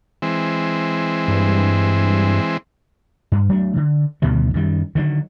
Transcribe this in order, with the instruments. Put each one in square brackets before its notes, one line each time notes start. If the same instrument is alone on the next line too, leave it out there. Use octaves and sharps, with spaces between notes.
[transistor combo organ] E3 G#3 C4
[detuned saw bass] G2
[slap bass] G2
F#3 A3 D4
D3
D2 B2 D#3 G3
F#2 D#3 G3
D3 D#3 F3 F#3